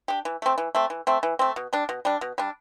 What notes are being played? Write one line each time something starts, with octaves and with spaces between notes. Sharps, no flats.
D4 G4
E3
A3 C4
E3
A3 C4
E3
A3 C4
E3
A3 C4
B2
G3 D4
B2
G3 D4
B2
G3 D4